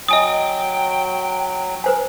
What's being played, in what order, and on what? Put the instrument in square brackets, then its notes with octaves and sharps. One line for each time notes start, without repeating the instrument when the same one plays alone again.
[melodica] F#3 [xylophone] D#5 G#5 D#6 [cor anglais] G5
[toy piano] B4 C5 G#5